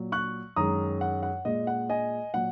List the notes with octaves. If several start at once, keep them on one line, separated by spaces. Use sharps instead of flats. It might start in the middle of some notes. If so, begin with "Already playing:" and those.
Already playing: A#2 F#3
C#6 F#6
F#2 D#3 G#3 A#5 D#6
F#5
F#5
A#2 G#3 D#5
F#5
D#5 G#5
A#2 F#3 F#5